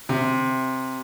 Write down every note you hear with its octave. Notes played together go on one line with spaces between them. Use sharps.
C3